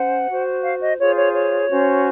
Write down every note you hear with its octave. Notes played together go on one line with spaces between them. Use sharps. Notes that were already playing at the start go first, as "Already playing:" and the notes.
Already playing: C#4 C5 F#5
F#4 C5
F5
D#5
F4 G#4 C5 C#5
C#5
C#5
C#4 F#4 C5